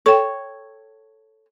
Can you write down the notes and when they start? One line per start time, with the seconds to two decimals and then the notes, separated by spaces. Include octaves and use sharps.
0.06 A4 C#5 G5 C#6